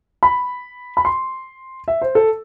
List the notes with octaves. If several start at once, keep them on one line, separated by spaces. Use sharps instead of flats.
B5
B5
C6
E5
C5
A4